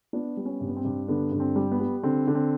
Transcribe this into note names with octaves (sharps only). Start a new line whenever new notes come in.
B3 D4
G3
C#4
G2
B3
C4
G2
D3 B3
G2
C4
G3
B3
G3
D3 C4
D3
C4